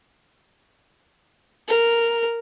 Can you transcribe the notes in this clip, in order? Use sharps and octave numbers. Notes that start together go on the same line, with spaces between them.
A#4